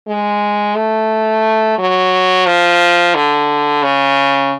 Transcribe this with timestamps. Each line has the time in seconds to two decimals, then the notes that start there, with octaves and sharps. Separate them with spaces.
0.08 G#3
0.76 A3
1.78 F#3
2.46 F3
3.15 D3
3.83 C#3